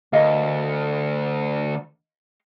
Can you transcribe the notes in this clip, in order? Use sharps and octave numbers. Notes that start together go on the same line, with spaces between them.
D2 A#4 D#5 F5